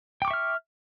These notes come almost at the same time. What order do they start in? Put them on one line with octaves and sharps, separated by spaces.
G5 D6 C#6 E5 F6